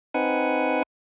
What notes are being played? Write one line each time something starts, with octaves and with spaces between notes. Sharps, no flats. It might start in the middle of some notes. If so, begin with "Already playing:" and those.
C4 D#4 B4 F#5 G#5